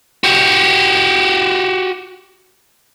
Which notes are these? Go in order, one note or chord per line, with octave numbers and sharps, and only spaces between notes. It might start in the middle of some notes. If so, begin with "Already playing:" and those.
F#4 G4